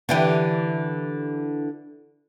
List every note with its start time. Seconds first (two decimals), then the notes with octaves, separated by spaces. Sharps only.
0.09 D3 E3 G4